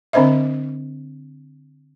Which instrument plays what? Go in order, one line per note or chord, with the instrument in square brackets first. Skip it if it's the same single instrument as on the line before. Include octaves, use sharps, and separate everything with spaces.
[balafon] D3 C4 D4 C5 D#5 E5